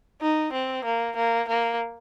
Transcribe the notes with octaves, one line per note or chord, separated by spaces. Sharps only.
D#4
C4
A#3
A#3
A#3